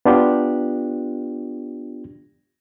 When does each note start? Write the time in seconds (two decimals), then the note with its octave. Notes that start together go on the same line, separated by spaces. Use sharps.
0.06 B3 D4 F4 G4